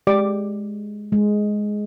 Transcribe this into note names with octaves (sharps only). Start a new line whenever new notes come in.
G#3 G4 D5 D6
G#3